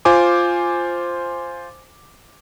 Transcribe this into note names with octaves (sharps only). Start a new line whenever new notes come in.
F4 C5 G#5 D6